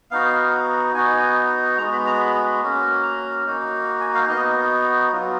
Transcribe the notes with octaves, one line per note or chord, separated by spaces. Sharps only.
B3 D#4 F#4 F5
B3 D#4 F#4 G#5
G#3 B3 F#4 A#5
B5
A#5
B5
A#3 C#4 F#4
A#5
A#3 D#4 F#4
G#5
F5
B3 D#4 F#4 D#5
F#3 B3 F4